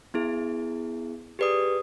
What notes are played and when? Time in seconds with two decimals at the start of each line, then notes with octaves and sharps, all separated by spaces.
0.14 B3 E4 G#4
1.39 G4 G#4 B4 D5 D#6